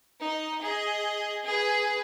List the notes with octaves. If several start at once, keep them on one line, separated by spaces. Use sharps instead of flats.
D#4 D#5
G#4 D#5
G#4 B4